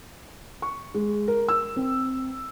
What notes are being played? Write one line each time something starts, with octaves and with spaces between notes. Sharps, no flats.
C#6
G#3
A#4
E6
C4